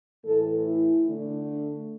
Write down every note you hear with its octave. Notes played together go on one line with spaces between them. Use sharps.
A2 E3 A3 A4
E4
D3 A3 D4